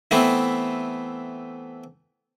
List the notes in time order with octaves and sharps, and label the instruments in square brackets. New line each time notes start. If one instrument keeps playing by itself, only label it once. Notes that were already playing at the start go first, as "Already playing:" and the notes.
[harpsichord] E3 A3 B3 C4